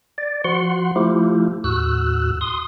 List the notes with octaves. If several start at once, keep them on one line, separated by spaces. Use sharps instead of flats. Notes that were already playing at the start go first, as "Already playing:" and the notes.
D5
F3 F#4 F#5 C6
F3 A3 E4 F4 G4
D#2 A2 F#4 E6 F#6
C6 D#6